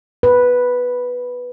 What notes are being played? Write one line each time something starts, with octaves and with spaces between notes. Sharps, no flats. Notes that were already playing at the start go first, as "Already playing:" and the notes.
B4